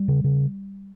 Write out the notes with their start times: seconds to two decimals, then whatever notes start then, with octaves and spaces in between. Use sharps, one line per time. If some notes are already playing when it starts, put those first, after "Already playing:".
Already playing: G3
0.08 C#3
0.24 C#3